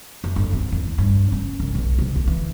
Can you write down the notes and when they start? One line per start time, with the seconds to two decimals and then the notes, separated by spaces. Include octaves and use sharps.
0.24 F#2
0.36 G1
0.53 C4
0.72 E2
0.98 G2
1.32 C#4
1.60 C2
1.75 B1
1.99 C2
2.16 D2
2.27 E3